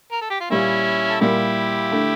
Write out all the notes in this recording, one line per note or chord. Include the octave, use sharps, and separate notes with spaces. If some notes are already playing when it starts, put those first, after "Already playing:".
A#4
A4
G4
F4
A#2 G3 A#3 C#4 E4
A4
A#2 G3 A#3 E4 G4
D3 A3